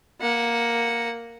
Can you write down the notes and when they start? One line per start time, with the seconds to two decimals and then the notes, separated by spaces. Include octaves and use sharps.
0.21 A#3 F#5